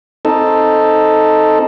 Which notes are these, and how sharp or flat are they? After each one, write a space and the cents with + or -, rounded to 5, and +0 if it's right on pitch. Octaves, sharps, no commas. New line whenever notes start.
C4 +5 D#4 +0 A4 +0